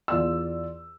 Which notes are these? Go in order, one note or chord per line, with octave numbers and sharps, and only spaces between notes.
E2 F4 D5 E6